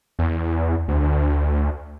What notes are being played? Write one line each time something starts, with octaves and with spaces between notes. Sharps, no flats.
E2
D2